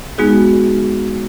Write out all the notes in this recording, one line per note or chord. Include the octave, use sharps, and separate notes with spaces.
G#3 B3 D#4 F#4 G#4